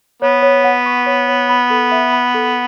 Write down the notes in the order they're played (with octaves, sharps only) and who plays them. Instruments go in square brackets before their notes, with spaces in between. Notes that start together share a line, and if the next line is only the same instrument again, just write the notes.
[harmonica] B3 [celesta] C#5
[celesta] C#5
F#5
C#6
C#5
C#5
B5
A4
E5
B5
A4